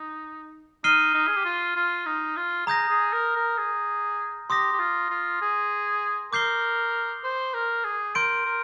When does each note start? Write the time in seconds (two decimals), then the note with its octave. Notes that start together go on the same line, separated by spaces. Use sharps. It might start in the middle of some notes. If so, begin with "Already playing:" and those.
Already playing: D#4
0.84 D#4 F6 C7 D#7 G7
1.14 D#4
1.27 G#4
1.36 G4
1.45 F4
1.76 F4
2.06 D#4
2.37 F4
2.67 G#4 A#5 D#6 G6 A#6
2.89 G#4
3.13 A#4
3.36 A#4
3.58 G#4
4.50 G4 C6 D#6 A#6
4.73 G4
4.80 F4
5.10 F4
5.42 G#4
6.33 A#4 D6 G6 C7 G7
7.24 C5
7.54 A#4
7.84 G#4
8.15 A#4 C6 G6 D7
8.45 A#4